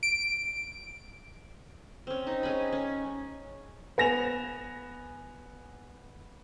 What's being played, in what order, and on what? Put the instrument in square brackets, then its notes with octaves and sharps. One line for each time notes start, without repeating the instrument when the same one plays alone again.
[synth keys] D7
[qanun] C4 C#4
D#4
G#3 C#4 G#5 B5
C#4
[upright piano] B3 G#5 A#6 E7 F7